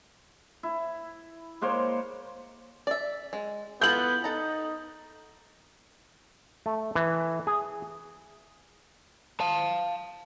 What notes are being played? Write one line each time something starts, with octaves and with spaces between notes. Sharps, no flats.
E4
G#3 A#3 C5 C#5
D5 E5
G#3
B3 E4 F4 A4 G6 F#7
D#4 A4 A#5
A3
E3
G#4
F5 A5